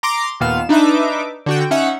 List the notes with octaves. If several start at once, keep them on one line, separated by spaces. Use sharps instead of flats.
A#5 C6 D6
D#2 A#2 B3 F5 E7
D4 D#4 B4 E5 D6
D3 F#4 G5
C#4 D#4 E5 F#5